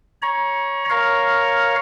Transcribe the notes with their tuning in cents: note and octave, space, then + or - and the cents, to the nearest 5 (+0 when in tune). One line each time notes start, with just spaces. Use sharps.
C#5 +0 A#5 +30
A#4 +0 C#5 +0 F5 +0